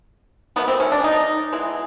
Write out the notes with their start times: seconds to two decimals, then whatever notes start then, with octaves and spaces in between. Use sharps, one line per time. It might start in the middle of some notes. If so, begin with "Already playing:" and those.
0.56 D#3 F#3 A3 B3
0.68 C4
0.80 C#4
0.92 D4
1.04 D#4
1.53 E3 G#3 B3